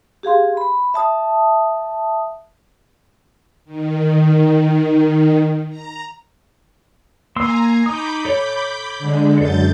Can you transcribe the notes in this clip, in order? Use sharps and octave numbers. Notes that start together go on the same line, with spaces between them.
G4 G#4 F5 C6
B5
E5 A5 D#6
D#3
A#5
A#3 G#5 A#5 C6 E6
D#4 B5 D6 D#6 G6
A4 C#5
D3 G#3
F#2 A4 G6 A6